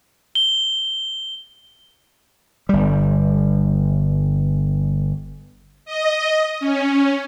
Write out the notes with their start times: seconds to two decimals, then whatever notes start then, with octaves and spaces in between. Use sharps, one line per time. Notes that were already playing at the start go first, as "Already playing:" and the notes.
0.35 G7
2.69 G1 G3
5.85 D#5
6.60 C#4